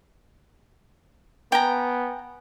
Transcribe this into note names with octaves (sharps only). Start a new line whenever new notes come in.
B3 G5 G#5 A#5